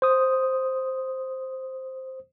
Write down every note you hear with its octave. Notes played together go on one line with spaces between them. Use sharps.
C5 D#6